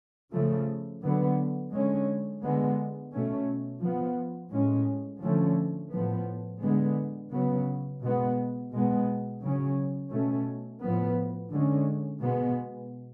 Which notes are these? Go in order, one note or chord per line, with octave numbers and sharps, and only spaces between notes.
C#3 F3 A3
D3 F#3 B3
D3 G#3 C#4
D3 G#3 B3
B2 A3 C#4
F3 B3
A2 G#3 C#4
D3 F3 A3 C#4
A2 F3 B3
D3 G#3 B3
C#3 F#3 B3
B2 G#3 B3
B2 G#3 B3
C#3 F#3 C#4
B2 A3 C#4
A2 F3 B3
D3 G#3 C#4
B2 G#3 B3